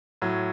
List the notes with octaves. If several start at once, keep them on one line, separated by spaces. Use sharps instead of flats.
A2 F#3